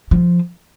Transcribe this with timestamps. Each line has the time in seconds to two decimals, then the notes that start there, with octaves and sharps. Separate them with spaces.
0.11 F3